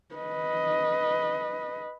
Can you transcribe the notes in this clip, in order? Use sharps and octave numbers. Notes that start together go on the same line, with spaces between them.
B4 D#5